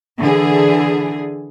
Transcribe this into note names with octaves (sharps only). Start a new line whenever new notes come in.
D3 E3 G#4